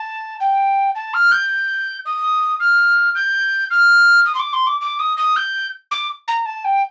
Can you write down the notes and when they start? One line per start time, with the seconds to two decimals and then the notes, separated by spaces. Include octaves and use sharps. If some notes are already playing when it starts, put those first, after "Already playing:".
Already playing: A5
0.40 G5
0.95 A5
1.14 F6
1.31 G6
2.05 D#6
2.60 F6
3.15 G6
3.70 F6
4.25 D#6
4.34 C6
4.39 D6
4.53 C6
4.66 D6
4.81 D6
4.99 D#6
5.17 D#6
5.36 G6
5.91 D6
6.27 A#5
6.45 A5
6.64 G5